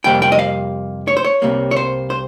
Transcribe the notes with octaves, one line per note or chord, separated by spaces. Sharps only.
F2 C3 G3 A#3 G5
G5
D#5
F5
C#5
C5
C#5
C2 C3 G3 A#3
C#5
C5
C5